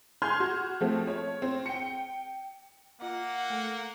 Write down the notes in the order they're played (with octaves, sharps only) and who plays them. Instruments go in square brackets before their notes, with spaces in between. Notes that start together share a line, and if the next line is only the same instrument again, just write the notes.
[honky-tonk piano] G#5 C6 F6 G6 G#6
F#4
F3 A3 C4
C#5
C4
G5 C#7
[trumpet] A#3 [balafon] F4 D#5 D6 [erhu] F#5
[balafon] A3 A4